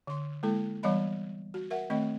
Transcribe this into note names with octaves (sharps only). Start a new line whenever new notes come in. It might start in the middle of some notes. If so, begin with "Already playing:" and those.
D3 C6
G#3 A#3 E4 A4
E3 G3 B3 C#5 D#5 B5
F#4
A#4 E5 F#5
D#3 A3 C4 D#5